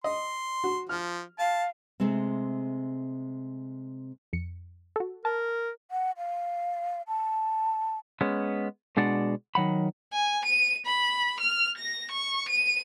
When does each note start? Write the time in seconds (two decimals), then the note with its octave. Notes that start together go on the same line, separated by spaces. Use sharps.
0.04 D#5 C6
0.64 F#4
0.89 F3 F6
1.39 F5 A5
2.00 C3 G#3 A3 C4
4.33 F2 C#7
4.96 F#4 A4
5.25 A#4 A5
5.91 F#5
6.17 F5
7.08 A5
8.21 G#3 B3 C#4
8.97 B2 G#3 D4 D5 F#5
9.55 D#3 F#3 F#5 B5
10.13 G#5
10.45 D#7
10.86 B5
11.40 F6
11.77 A#6
12.11 C#6
12.49 D#7